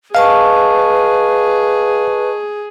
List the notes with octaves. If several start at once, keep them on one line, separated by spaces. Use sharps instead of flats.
G#4 B4 D#5 F5 A5 C#6